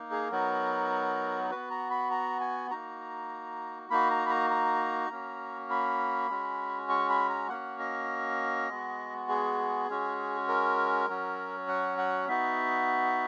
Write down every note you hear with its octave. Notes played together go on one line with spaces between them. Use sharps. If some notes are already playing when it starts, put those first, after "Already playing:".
Already playing: A#3 D#4
G#4
F#3 B3 D#4 F#4 A#4
B3 F#4 B4
A#5
B5
A#5
G#5
A#3 D#4 F#4 A#5
A#3 D#4 F#4 B5
A#5
B5
A#5
A#5
A#3 C#4 F#4
B5
G#3 C#4 F#4
C#6
B5
A#5
A#3 C#4 F#4 F#5
D#5
G#3 B3 F#4
G#4
G#3 C#4 F#4
A#4
F#3 C#4 F#4
F#5
F#5
B3 D#4 F#4 E5